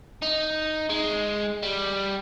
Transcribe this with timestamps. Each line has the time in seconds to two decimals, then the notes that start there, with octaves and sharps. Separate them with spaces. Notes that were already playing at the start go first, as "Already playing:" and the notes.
0.22 D#4
0.90 G#3
1.63 G3